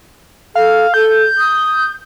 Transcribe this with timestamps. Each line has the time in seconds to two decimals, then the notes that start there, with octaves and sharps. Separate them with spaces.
0.55 A4 F5
0.94 A4 G6
1.38 D#6